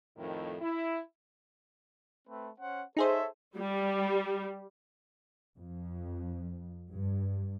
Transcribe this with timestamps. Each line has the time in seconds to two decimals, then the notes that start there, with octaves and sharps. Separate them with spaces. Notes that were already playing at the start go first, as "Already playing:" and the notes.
0.17 F2 A2 D#3
0.60 E4
2.28 A3 C4 B4
2.59 C#4 C5 F#5
2.97 D#4 G#4 A4 C5 C#5 E5
3.56 G3
5.57 F2
6.92 G2